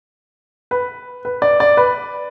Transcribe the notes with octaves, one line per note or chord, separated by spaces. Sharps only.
B4
B4
D5
D5
B4